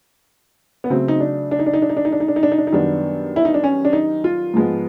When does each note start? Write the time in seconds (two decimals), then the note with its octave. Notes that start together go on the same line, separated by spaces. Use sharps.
0.84 B3
0.90 C#3 F#3 A3 C4
1.08 D#4
1.20 D4
1.51 D4
1.59 D#4
1.66 D4
1.73 D#4
1.82 D4
1.89 D#4
1.97 D4
2.05 D#4
2.12 D4
2.20 D#4
2.28 D4
2.36 D#4
2.43 D4
2.52 D#4
2.58 D4
2.67 D#4
2.72 F#2 D#3 G3 B3 D4
3.36 E4
3.45 D#4
3.54 D4
3.64 C#4
3.85 D4
3.93 D#4
4.24 F4
4.54 G#2 F3 G#3 B3